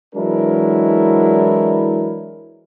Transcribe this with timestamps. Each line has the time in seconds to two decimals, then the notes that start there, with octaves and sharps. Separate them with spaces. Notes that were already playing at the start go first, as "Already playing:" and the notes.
0.15 E3 F#3 G#3 D4 E4 A#4